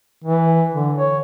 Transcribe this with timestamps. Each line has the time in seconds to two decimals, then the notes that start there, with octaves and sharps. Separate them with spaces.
0.24 E3
0.74 D3
0.97 C#5